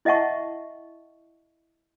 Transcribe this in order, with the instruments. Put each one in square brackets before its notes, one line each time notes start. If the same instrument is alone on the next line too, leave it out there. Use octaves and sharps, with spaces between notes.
[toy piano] E4 D#5 E5 F#5 A5 C#6